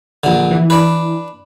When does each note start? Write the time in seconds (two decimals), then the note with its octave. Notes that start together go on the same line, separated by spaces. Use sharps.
0.24 A#1 D3
0.51 E3
0.70 D4 B4